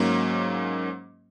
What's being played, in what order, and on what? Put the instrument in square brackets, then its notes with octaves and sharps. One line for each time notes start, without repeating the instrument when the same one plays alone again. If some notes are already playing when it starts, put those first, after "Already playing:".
Already playing: [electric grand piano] G#2 F#3 A#3 C#4